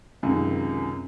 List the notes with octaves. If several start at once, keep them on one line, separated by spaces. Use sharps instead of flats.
C#2 F#2 C3 D#3